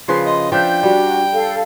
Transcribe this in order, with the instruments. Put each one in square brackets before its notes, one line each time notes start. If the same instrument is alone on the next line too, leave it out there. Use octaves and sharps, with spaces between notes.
[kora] C#3 F3 B4 [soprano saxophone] C6
[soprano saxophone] D#5 [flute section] C6
[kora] F3 D4 E5 [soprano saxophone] G5 [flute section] G6
[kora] G3 [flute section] D4 F#4
[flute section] A4 F5